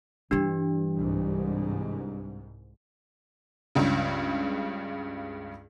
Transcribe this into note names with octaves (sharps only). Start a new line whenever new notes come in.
G2 E3 G3 D4 G4
C2 G#2
C#2 G2 C#3